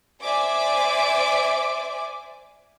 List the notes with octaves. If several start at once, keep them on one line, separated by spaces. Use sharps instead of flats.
C5 D5 E5 G#5 D6